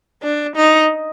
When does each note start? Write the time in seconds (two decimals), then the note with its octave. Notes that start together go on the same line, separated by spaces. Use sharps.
0.23 D4
0.56 D#4